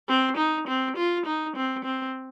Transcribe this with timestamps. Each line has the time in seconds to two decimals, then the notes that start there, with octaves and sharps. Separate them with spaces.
0.08 C4
0.37 D#4
0.67 C4
0.97 F4
1.26 D#4
1.56 C4
1.85 C4